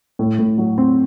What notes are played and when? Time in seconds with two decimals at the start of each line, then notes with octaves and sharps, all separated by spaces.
0.19 A2
0.39 A2
0.58 F#3
0.78 C4